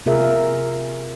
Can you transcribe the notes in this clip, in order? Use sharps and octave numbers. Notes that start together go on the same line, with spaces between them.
C3 F4 G#4 A#4 E5